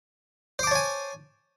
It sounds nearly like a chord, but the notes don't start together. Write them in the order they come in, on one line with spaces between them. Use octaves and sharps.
C5 D6 A5 C#5 G#5